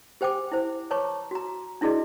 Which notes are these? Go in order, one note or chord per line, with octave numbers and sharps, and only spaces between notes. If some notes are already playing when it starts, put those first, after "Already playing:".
G4 C5 G5 G#5 D6
E4 C5
B4 C#5 A5 A#5 C#6 D6
F#4 A#5
D4 E4 F#4 G#4 D5 D#5